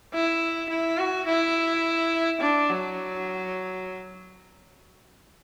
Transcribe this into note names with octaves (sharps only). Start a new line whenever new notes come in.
E4
E4
F#4
E4
D4
F#3